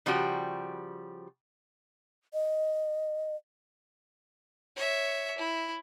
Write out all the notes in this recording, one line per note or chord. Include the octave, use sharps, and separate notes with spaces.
C#3 F3 G3 F#4 G4
D#5
C#5 E5
E4